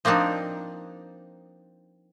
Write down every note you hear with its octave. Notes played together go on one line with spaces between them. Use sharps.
F3 A#3 C4 D4 D#4